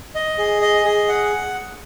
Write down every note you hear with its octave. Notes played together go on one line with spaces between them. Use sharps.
D#5
G#4
D#5
G#4
F#5